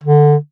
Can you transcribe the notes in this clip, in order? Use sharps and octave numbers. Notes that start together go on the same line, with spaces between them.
D3